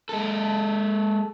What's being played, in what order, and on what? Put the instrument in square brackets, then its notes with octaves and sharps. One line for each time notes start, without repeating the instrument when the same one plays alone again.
[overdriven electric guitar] G#3 A4